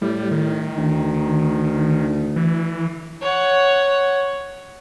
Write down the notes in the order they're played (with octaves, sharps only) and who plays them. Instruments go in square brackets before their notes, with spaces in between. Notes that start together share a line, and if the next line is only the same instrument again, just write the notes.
[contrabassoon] A2 [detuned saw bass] G3
[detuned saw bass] D#3
[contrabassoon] D2
[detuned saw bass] E3
[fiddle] C#5 F#5